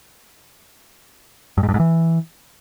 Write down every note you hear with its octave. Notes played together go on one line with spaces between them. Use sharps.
G2
G#2
G2
G#2
E3